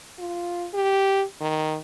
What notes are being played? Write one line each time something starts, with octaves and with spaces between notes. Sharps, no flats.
F4
G4
D#3